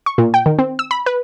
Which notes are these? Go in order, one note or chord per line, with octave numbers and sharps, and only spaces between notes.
C#6
A#2
G5
D#3
C4
E6
B5
B4